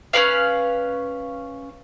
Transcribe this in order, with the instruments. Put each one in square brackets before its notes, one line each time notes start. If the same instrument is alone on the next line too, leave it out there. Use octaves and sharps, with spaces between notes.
[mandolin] C#4 A#4 B4 F5